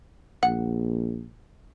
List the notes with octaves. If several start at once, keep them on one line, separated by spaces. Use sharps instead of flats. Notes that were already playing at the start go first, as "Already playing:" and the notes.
A#1 F#5